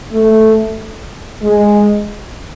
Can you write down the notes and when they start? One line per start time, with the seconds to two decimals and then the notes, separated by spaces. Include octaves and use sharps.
0.12 A3
1.42 G#3